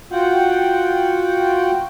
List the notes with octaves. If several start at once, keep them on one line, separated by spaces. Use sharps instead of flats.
F4 F#4 F#5 G5